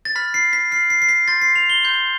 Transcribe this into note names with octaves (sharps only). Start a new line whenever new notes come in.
A6
B5 F6 B6
C7
B6
B5 F6 C7
C7
C7
B6
C6 G6 A6
C7
F7
G7
C6 G6